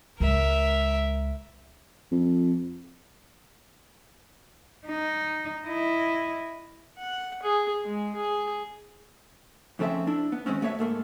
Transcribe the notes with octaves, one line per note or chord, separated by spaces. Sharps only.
C#2 G#3 A#4 E5
F2
D#4
E4 D#5
F#5
G#4
G#3
G#4
F2 C#3 A3 C4 E5
D4 E4
B3
D#3 F3 G#3 C4 C#4
B2 A3 B3 C#5 E5
G#2 A3 A#3